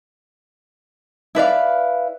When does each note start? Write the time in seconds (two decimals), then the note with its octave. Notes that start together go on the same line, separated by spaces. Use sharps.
1.35 E4 B4 D5 F5